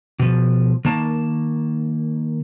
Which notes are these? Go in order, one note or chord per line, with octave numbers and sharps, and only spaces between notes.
B2 F3
D#3 A#3 A5